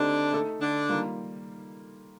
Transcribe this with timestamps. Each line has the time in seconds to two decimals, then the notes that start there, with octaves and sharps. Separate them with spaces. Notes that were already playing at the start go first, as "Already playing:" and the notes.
Already playing: D3 A3 C4 D4 D#4 G4
0.32 A3 D#4 A4
0.61 D3 D4
0.89 D#3 G3 A#3 F4 A#4